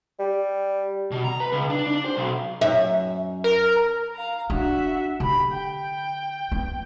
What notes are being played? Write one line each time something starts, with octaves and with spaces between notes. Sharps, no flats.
G3
B2
A#5
B4
C#2
D4
D4
C5
B1
F#2 E5
A#4
F5 A#5
D4 F#4 E5
D3 G4 B5
G5
B3